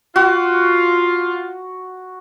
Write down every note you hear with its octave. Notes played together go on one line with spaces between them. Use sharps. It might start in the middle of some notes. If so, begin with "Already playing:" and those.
F4 F#4